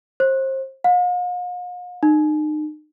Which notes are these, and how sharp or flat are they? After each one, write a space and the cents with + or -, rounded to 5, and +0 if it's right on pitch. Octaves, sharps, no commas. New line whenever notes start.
C5 +30
F5 +45
D#4 -35